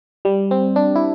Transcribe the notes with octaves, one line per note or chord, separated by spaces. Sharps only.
G3
C4
D4
E4